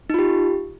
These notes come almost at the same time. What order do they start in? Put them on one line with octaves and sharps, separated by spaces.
D#4 F4 G4